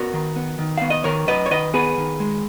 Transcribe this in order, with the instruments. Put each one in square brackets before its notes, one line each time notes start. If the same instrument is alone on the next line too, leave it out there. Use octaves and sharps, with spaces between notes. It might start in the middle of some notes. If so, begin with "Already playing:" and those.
Already playing: [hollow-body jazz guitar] B3 F#4 A#4
D#3
B3
D#3
B3 F5
D#5
D#3 A#4 C#5
F#2 B4 D#5
C#5
D#3 B4 D#5
B3 G#4 B4
D#3
G#3